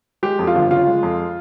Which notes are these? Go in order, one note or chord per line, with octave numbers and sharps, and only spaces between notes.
G#3 G4
F2
F4
G1
C#3 F4
G#3
F2